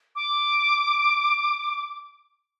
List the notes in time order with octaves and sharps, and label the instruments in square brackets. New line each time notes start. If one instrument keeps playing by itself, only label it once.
[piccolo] D6